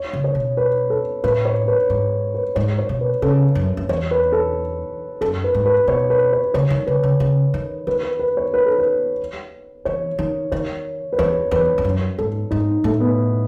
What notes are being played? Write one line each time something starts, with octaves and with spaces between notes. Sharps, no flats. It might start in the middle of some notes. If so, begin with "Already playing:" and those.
Already playing: C#5
C#3
C#5
B2
B4
A4
A2 B4
C#5
B4
G#2
B4
G#2 C#5
C#5
B2
B4
C#3 A4
F#2
F#2
E2 C#5
B4
A4
F#2 A4
B4
G#2
B4
B2 C#5
B4
C#5
C#3 C#5
D#3
C#3 B4
C#3
C#3
D#3
D#3 B4
B4
B4
C#5
B4
A4
B4
E3 C#5
D#3
D#3 C#5
B4
E2 C#5
E2 B4
E2
F#2
G#2 A4
G#2 D#4
A2 A3
B3